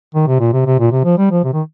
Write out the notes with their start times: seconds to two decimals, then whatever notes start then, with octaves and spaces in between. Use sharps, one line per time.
0.15 D#3
0.27 C3
0.40 A#2
0.53 C3
0.66 C3
0.79 A#2
0.92 C3
1.05 F3
1.18 G3
1.31 F3
1.44 C3
1.53 D#3